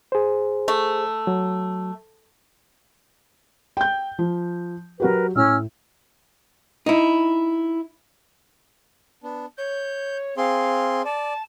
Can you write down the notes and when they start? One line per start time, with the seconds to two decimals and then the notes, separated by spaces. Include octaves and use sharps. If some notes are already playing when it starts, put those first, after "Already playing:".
0.12 G#4 C5
0.68 A3
1.27 F#3
3.77 G5 G6
4.19 F3
5.00 F#3 F#4 G4 A#4 B4
5.35 A2 C#4 E6 F6
6.86 D#4 E4
9.23 B3 D4
9.58 C#5 G6
10.37 C4 G#4 F5 C6
11.05 D5 A5